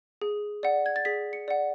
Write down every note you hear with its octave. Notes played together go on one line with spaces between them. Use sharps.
G#4
D5 F#5
G#6
A6
G#4 B6
C#7
D5 F#5